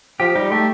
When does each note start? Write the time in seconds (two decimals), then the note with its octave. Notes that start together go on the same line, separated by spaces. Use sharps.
0.20 F3 G4
0.36 G3 D#4
0.51 A3 G4